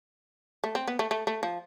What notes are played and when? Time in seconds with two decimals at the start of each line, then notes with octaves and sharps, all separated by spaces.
0.64 A3
0.75 C4
0.87 B3
0.99 A3
1.11 A3
1.27 A3
1.43 F3